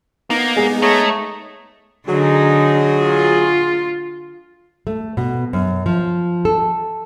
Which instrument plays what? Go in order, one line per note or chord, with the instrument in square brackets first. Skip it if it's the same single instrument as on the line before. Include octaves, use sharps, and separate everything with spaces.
[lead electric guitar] A#3 [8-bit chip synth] B3 D#4
[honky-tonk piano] G#3 G#4
[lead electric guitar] A3 [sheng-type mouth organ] C#5 D#5 A#5
[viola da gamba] D3 D#4 [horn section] F#3 G#4
[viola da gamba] F4
[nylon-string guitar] A3
B2
F#2
F3
A4